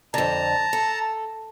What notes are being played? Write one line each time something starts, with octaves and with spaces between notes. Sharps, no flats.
F2 D3 A5 A#5
A4